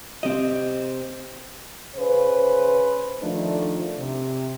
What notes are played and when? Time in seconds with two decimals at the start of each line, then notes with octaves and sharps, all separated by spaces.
0.23 C3 C4 D#5
1.96 C#3 B4 C5
3.22 D#3 F3 A3 D4
3.98 C3